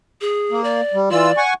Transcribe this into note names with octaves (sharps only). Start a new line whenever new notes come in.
G#4
A#3
D5
G3
E3 F4 D5 E6
F#5 G#5 C#6